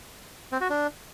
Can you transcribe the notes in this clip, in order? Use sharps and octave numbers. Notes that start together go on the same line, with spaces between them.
C4
F#4
D4